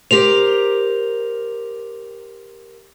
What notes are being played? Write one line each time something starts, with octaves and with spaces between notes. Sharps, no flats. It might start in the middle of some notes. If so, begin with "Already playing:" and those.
G4 A#4 C5 F7